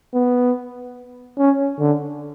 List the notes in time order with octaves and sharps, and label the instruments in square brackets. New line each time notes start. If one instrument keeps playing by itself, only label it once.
[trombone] B3
C#4
D3